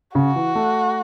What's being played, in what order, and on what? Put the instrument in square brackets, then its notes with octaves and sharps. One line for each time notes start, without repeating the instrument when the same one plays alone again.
[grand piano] C#3 [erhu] F#4
[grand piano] E3
A3